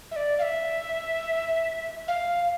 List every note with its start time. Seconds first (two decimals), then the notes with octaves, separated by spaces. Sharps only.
0.11 E5
0.16 D5
0.39 F5
0.42 E5
2.08 F5